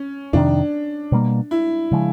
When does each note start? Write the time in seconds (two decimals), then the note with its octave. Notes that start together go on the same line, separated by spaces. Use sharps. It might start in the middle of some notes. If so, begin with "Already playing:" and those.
Already playing: C#4
0.33 F2 C3 D#3 D4
1.12 B2 G3 A#3
1.51 E4
1.91 C#3 F3 G#3